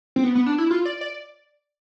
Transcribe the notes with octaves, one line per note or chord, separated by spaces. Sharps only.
C4
B3
B3
D4
E4
F4
D5
D5